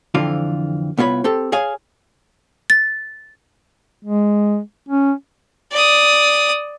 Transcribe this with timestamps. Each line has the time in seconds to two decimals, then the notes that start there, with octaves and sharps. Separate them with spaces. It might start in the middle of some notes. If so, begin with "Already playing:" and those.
0.14 F2 D3 E3 C4 F4
0.98 C2 B3 F4 C#5 B5
1.24 C4 G4 A4
1.52 G#4 C#5 F5 G#5
2.70 A6
4.03 G#3
4.89 C#4
5.72 D5 D#6